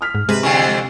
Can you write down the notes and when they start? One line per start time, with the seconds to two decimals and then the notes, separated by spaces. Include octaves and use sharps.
0.01 D#6 F6 B6
0.15 G#2
0.29 C3 G#3 B4
0.43 F2 D3 E3 G5 G#5 C#6